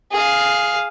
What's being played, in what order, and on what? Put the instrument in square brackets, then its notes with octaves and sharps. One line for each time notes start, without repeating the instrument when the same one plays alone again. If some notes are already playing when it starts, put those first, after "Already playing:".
[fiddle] G#4 F5